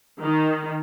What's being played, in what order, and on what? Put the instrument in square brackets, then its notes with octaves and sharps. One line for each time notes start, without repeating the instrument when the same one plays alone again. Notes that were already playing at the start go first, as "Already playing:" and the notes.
[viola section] D#3